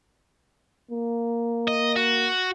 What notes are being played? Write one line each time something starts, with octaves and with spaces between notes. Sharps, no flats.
A#3
D#5
F#4